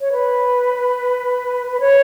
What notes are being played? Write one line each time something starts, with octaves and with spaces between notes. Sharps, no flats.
C#5
B4
B4
C#5